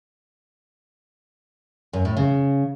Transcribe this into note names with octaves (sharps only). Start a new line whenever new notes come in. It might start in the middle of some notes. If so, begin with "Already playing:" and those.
F#2
A2
C#3